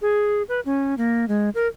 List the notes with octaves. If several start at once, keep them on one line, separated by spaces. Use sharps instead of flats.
G#4
B4
C#4
A#3
G#3
A#4